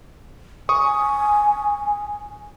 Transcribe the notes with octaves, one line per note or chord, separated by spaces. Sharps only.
G#5 C#6 D#6